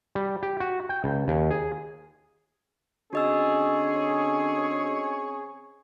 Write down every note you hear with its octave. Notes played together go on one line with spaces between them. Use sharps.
G3
G4
F#4
G5
C#2
D#2
G#4
D3 C4 C#4 F#4 G#4 C#5 D#5 E6